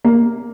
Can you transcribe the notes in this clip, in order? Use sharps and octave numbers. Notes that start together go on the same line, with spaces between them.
A#3